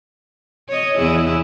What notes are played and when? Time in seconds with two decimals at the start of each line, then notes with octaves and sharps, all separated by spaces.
0.69 C#5 D#5
0.97 E2 E4 G#4